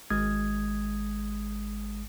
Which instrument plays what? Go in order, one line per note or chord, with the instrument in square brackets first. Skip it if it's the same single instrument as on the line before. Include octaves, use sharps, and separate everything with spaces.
[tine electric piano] G#1 G#3 D#6 G#6